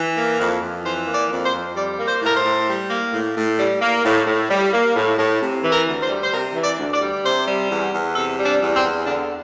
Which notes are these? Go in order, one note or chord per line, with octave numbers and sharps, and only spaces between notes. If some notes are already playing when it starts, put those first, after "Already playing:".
Already playing: E3
A#3
F2
F2
E3 C5
A#3
D5
F2
C5
F2
G3 D5
A#3
C5
A2 A#4
C5
A2
G3
A#3
A2
A2
G3
A#3
A2
A2
G3
A#3
A2
A2
C3
E3
A#4
D2
C5
G3
C5
C3 A#4
E3
D5
D2
D5
G3
C3 C5
G3
E2
E2
C3 A4
G3
D4
E2
C4
E2
D3 D4